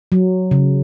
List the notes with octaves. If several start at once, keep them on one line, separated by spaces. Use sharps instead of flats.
F#3
C#3